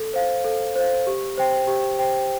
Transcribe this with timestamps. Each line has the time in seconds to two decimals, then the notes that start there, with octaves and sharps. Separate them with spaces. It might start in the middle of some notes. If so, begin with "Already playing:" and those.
Already playing: A4
0.14 C5 F5
0.45 A4
0.76 C5 F5
1.07 G4
1.38 C5 G5
1.67 G4
1.99 C5 G5